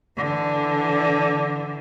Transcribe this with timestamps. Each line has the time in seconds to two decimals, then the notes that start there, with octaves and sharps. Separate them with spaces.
0.17 D3 E3